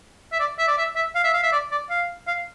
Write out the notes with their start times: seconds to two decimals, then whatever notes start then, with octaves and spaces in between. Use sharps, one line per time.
0.32 E5
0.40 D5
0.59 E5
0.67 D5
0.78 E5
0.95 E5
1.15 F5
1.24 E5
1.34 F5
1.43 E5
1.52 D5
1.72 D5
1.90 F5
2.27 F5